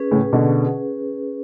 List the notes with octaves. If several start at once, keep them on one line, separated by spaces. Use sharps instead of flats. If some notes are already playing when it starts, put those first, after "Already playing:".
Already playing: C#4 G#4 B4
A2 C#3
B2 D3